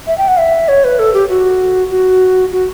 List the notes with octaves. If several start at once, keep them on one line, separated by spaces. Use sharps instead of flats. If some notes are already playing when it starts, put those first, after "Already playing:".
E5
G5
F#5
E5
C#5
B4
A4
G4
F#4
F#4
F#4